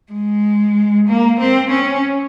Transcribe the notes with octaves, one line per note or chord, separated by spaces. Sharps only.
G#3
A#3
C4
C#4